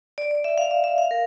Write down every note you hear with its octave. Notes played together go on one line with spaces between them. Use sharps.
D5
D5
E5
F5
E5
E5
F5
A#4